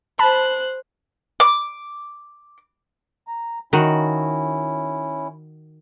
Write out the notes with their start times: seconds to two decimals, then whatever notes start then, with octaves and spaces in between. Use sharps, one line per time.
0.19 C5 A5 B5 F#6
1.40 D6
3.28 A#5
3.73 D#3 C#4 E4 F#4